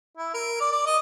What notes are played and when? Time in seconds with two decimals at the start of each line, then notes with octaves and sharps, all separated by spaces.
0.17 E4
0.34 A#4
0.60 D5
0.72 D5
0.86 D#5